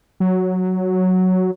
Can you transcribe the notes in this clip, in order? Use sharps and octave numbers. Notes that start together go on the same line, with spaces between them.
F#3